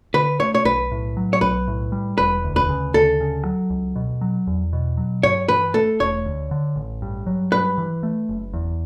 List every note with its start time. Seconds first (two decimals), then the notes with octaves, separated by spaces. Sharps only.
0.14 D3 B4
0.40 A3 C#5
0.55 C#5
0.65 B1 B4
0.91 A2
1.17 F#3
1.33 C#5
1.41 B1 B4
1.68 A2
1.92 G3
2.18 E1 B4
2.44 D2
2.56 B4
2.69 C#3
2.94 D2 A4
3.20 C#3
3.45 F#3
3.70 C#2
3.96 B2
4.21 F#3
4.47 E2
4.73 B2
4.97 F#3
5.23 G2 C#5
5.48 E3 B4
5.74 A3 A4
6.00 E1 C#5
6.25 D2
6.51 D3
6.76 A1
7.02 G2
7.27 F#3
7.52 G2 B4
7.78 E3
8.03 A3
8.29 F#1
8.53 E2